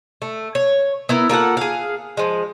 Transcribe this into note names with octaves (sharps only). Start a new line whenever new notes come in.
A3
C#5
B3 E4 A#4
A#3 F4 A4 F#5
G#4 F5
F3 G#3